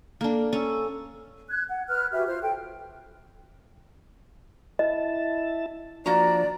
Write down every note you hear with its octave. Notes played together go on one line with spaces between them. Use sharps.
A#3 D4 A4
C#4 A4 E6
F#6 G#6
F#5
B4 F6 F#6
F#4 G4 B4 E5
F4 C5 F6
A4 G5
E4 D#5 A5
F3 A#3 D4 F#4 D5 A#5